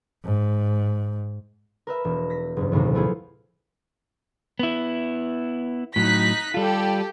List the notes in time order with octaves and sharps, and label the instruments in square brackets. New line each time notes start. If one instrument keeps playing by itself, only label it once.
[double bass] G#2
[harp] A#4 B4 E5
E1
A#6 B6
F#1 G2
A#1 D#2 A2 C3
A3 B3 E4 F4 G#4
[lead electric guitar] B3 E4
[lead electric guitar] A2 F#3 [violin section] D#4 F#6 B6
[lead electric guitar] G3 F4 [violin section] G4 A4